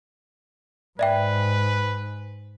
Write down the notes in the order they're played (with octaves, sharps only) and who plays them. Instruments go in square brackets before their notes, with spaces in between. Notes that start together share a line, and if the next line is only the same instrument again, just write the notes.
[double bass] G#2 [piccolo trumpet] B4 [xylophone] D5 E5 G5